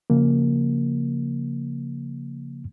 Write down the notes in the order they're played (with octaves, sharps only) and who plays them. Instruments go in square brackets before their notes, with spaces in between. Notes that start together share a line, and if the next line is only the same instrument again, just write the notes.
[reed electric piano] C#3 F3 A#3